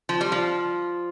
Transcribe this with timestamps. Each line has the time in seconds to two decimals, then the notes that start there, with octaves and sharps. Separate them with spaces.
0.09 F3
0.21 G3
0.32 F3